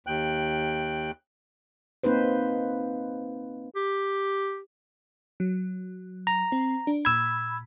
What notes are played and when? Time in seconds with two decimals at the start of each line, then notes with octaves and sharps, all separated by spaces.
0.07 D#2 G5 F#6
2.03 A#3 C4 D#4 B4 C5
3.76 G4
5.40 F#3
6.27 A#5
6.52 C4
6.87 D4
7.05 A#2 B5 E6 G#6